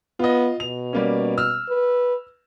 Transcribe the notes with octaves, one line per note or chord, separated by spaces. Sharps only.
B3 F4 D#5
B2 F7
G3 A#3 C#4
E6 F6
B4